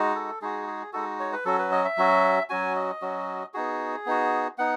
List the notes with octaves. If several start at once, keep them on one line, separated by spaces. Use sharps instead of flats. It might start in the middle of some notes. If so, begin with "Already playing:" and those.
Already playing: G#3 D#4 F#4
A4
G#3 D#4 F#4 G#4
G#4
G#3 D#4 F#4 A4
C#5
B4
F#3 C#4 F#4 A4
B4
D#5
E5
F#3 C#4 F#4
F#3 C#4 F#4 G#5
D#5
F#3 C#4 F#4
B3 D#4 F#4 G#4
B3 D#4 F#4
B3 D#4 F#5